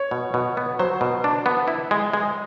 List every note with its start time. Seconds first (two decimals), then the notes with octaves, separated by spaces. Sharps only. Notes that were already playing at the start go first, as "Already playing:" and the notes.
Already playing: C#5
0.11 B2
0.34 B2
0.57 B3
0.79 F#3 C5
1.01 B2
1.24 D4
1.46 B3
1.68 E4
1.91 G#3
2.13 G#3